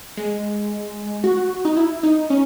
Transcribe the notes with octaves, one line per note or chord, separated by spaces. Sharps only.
G#3
F#4
D#4
E4
D#4
C#4